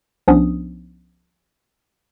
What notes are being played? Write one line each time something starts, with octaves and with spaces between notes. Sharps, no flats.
C2 F3 B3 C#4 D4 D#6